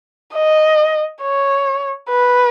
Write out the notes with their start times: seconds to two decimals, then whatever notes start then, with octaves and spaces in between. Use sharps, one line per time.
0.35 D#5
1.22 C#5
2.10 B4